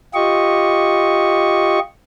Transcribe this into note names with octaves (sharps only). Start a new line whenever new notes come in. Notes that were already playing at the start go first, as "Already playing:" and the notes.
F4 G4 D#5 C#6